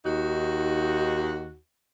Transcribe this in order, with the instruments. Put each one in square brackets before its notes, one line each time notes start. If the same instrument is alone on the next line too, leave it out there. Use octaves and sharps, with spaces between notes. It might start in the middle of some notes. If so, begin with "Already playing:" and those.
[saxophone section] D#2 D#4 F#4